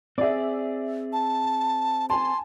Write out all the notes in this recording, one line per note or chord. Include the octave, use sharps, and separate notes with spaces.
C4 G#4 D5 E5
A5
G#5 A5 C6